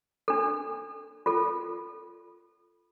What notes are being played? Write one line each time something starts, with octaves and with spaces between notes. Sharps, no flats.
D4 A4
F4 A4